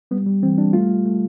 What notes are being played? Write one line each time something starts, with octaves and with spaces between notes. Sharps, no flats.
G3 B3
G3
E3 C4
G3 D4
A3 F4
A3
A3